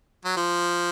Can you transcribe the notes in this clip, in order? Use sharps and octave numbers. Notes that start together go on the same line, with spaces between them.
F#3
F3